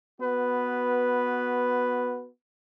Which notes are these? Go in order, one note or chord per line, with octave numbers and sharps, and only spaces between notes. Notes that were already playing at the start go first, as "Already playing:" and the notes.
B3 F#4 B4